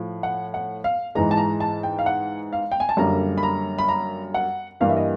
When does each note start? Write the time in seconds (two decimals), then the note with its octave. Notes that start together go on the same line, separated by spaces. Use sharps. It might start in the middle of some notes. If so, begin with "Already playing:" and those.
Already playing: A2 F3
0.23 F#5
0.54 F#5
0.84 F5
1.15 G#2 E3 G#3 A#5
1.31 A5
1.37 A#5
1.60 A5
1.83 G5
1.99 F5
2.06 F#5
2.53 F5
2.72 G5
2.80 G#5
2.89 A5
2.97 F#2 D3 G3 A#3 A#5
3.38 B5
3.43 A#5
3.78 B5
3.88 A#5
4.34 F#5
4.80 G2 E3 G3 A#3 F5
4.89 E5
4.97 D#5